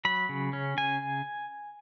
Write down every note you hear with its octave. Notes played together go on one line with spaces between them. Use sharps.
F#3 B5
C#3
C#4
C#3 G#5